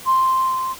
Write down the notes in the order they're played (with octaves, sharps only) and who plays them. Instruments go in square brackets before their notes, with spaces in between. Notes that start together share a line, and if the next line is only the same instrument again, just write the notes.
[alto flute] C6